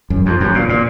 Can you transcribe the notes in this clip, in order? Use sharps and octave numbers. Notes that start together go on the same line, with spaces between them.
F#2
F2
F#2
A#2
A#2